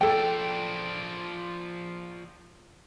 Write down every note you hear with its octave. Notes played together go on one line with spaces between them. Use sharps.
F3 A4 D5 G5